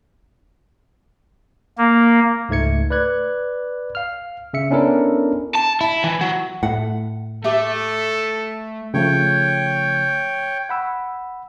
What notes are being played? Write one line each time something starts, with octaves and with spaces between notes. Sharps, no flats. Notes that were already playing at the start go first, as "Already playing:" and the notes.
A#3
C#2 G#2 A3 G#6 C#7
B4 D5 F#6 G#6
F5 F6
C#3 E5 C#7
B3 C#4 D4 E4 A4 A#4
A5
E4
E3
F#3
A2 F#5
A3 G4 A4 E5
C#3 F3 A3 C#5 G5
F#5 B5 E6